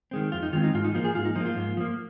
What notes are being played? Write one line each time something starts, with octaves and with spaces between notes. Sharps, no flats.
D#3 G#3 C4
F2 F4
D#4
D#3 G#3 C4 F4
D#4
G#2 F4
D#4
F3 A#3 F4
G#4
G#2 F4
D#4
F3 A#3 D#4
F4
G#2
F3 A#3